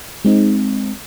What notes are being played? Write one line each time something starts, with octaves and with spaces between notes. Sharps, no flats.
G#3 C4 D#4